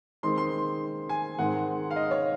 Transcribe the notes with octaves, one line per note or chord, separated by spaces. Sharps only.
D#3 G#3 C4 D#4 C6
C6
G#5
G#2 D#3 G#3 C4 F#5
F5
D#5
C#5